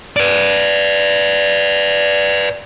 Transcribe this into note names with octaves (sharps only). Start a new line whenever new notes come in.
B4 D5